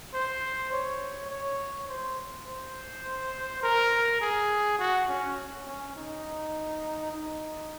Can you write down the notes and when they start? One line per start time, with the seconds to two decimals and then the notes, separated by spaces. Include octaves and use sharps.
0.14 C5
0.72 C#5
1.30 C#5
1.88 C5
2.46 C5
3.63 A#4
4.22 G#4
4.79 F#4
5.08 C#4
5.66 C#4
5.95 D#4
7.12 D#4